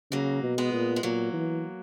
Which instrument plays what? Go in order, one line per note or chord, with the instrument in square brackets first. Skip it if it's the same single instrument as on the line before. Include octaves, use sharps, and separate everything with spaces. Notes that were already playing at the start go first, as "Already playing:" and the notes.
[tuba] C#3 [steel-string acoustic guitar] F#3 A#3
[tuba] B2
[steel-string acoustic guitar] G#3 B3
[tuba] A#2
[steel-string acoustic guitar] G#3
[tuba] A#2 [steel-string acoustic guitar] F#3 A#3
[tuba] E3